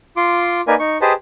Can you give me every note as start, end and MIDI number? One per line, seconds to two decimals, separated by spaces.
0.17 0.61 65
0.17 0.61 84
0.17 0.61 86
0.68 0.75 58
0.68 0.75 63
0.68 0.75 70
0.68 0.75 71
0.68 0.75 74
0.68 0.75 80
0.79 0.98 63
0.79 0.98 85
1.01 1.13 67
1.01 1.13 68
1.01 1.13 71
1.01 1.13 72
1.01 1.13 75
1.01 1.13 81